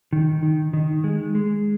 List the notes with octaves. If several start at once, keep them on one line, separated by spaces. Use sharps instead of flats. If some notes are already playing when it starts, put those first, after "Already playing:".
D#3
D#3
D#3
G#3
G#3